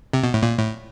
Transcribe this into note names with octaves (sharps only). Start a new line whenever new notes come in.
C3
B2
A2
A#2
A2